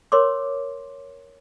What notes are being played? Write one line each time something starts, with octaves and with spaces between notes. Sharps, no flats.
A#4 C#5 C6 D6